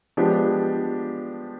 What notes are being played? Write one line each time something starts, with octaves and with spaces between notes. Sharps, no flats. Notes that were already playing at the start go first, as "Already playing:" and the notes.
F3 G#3 B3 D4 G4